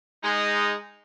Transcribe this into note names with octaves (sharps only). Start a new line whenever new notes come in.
G#3 D#4